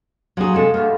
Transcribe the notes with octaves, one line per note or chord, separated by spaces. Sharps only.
F3 F#3 G#4 C5 A#5
C3 G#3 G#4 A4 D#5 A5
G2 B2 A3 F4